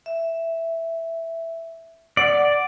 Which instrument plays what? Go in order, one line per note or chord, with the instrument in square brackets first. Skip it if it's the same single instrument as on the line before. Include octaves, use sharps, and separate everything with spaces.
[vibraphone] E5
[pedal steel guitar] D5 [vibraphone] F#5